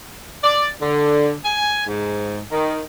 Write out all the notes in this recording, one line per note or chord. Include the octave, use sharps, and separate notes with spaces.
D5
D3
G#5
G#2
D#3